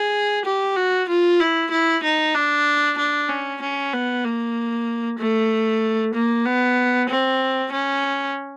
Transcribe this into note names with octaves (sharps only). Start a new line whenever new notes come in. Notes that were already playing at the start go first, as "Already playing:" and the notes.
Already playing: G#4
G4
F#4
F4
E4
E4
D#4
D4
D4
C#4
C#4
B3
A#3
A3
A#3
B3
C4
C#4